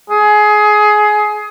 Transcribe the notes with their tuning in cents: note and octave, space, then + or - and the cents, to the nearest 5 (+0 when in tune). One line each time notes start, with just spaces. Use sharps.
G#4 +20